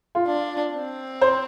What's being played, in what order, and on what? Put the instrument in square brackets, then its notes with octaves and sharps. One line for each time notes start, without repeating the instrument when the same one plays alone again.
[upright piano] F4
[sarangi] D4
C4
[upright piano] C5